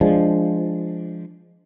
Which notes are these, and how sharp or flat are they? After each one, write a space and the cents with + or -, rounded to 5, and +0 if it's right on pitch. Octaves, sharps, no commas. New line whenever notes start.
F3 -10 G#3 +0 D4 +0